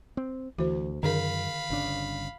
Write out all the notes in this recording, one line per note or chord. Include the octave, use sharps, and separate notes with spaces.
C4
D2 E3 F#4 C5
F#2 D3 D#3 G#4 A#4 F5 B5
G1 C#3 D4